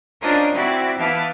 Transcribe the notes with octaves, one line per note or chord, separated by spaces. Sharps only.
C#4 D4 F4 A#4 C5 D#5
C4 E4 F#4 D5
E3 B3 E4 F5 A5 D6